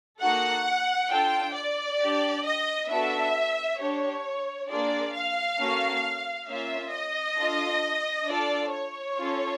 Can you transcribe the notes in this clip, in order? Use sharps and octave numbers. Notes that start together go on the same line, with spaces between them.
A#3 D#4 F#4 A4 F#5
D4 F4 A4 G5
D5
D4 G4
D#5
B3 D4 F#4 A4 E5
D4 G4 C#5
A#3 D4 F4 G#4 D5
F5
A#3 C#4 F#4 A4
A#3 C#4 F4 E5
D#5
D4 F4 A4
D4 F4 A4 D5
C#5
C#4 F4 A4